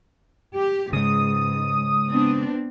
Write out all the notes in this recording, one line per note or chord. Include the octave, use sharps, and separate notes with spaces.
G4
G#2 C#3 G#3 D#6
B3 C4 D4